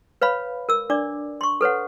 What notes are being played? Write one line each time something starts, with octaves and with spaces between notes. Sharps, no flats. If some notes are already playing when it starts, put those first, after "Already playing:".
B4 C#5 F5 B5
A#4 E6
D4 D5 D6
C6 C#6
A4 B4 C#5 F#5